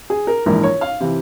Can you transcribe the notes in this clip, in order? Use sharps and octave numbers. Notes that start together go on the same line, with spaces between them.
G#4
A#4
A#1 G#2 E3 A#4
C#5
F5
C3 E3